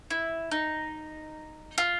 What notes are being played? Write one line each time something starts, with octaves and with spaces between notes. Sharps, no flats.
E4
D#4
F4